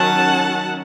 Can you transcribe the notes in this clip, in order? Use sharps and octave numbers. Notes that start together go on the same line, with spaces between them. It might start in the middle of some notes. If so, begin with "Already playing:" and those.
Already playing: D#3 F#3 C#4 F#5 A5